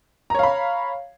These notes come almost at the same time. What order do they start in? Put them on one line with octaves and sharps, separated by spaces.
A#5 C#5 F5 B5